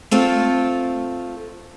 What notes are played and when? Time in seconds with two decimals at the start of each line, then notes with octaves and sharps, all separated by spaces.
0.11 A3 C4 F4 A4